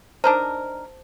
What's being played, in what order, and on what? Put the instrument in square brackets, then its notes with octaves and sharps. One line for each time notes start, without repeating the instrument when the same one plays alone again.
[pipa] D4 D#4 A#4 [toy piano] C5 A5